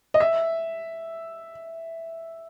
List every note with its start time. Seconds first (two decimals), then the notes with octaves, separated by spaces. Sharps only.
0.14 D#5
0.20 E5